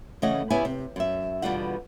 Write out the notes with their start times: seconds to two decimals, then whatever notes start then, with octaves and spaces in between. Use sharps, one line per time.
0.22 C#3 E3 A3 C#4 D#5 F#5
0.50 C#3 B3 E4 G4 C#5 G#5
0.65 C3
0.96 F#2 E5
1.42 E2 B2 D3 G3 F4 F#5